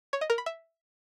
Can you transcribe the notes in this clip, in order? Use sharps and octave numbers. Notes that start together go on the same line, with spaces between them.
C#5
D#5
A#4
B5
E5